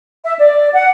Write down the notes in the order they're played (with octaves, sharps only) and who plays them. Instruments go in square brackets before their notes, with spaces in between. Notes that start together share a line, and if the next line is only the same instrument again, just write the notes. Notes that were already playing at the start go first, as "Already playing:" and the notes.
[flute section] E5
D5
F#5